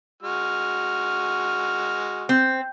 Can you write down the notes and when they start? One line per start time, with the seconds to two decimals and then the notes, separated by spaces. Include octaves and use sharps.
0.23 G#3 F#4 F6
2.29 C4